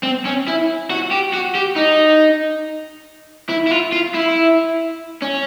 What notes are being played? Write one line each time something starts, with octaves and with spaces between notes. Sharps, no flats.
C4
C#4
E4
F#4
G4
F#4
G4
D#4
E4
E4
F4
F4
E4
C#4